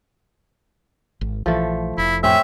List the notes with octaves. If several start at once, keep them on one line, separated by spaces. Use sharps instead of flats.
G#1
A#1 E3 F3 A3
F1 E4
F2 A2 C4 C#4 E5